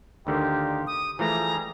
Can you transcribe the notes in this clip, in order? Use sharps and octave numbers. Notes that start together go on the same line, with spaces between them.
D2 D3 D#3 D#4 F4 G4
D#6
E3 F3 G3 A3 G#4 A#5